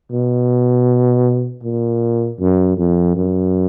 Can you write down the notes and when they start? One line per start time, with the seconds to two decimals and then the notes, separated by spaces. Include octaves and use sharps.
0.11 B2
1.63 A#2
2.40 F#2
2.78 F2
3.16 F#2